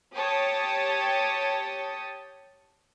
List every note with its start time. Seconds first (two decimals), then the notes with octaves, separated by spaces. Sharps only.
0.16 G4 C#5 G5 A5 D#6